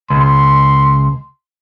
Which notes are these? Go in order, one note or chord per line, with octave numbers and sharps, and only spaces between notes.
C#2 C6